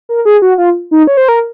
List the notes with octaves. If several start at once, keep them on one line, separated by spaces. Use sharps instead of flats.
A#4
G#4
F#4
F4
D#4
C#5
C5
A#4